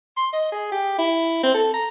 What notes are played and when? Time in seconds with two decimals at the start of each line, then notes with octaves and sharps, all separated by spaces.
0.17 C6
0.33 D#5
0.52 G#4
0.72 G4
0.98 E4
1.43 C4
1.54 A4
1.74 A#5